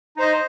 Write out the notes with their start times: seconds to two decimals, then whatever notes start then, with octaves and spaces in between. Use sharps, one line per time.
0.17 D#4
0.19 C5
0.22 D#5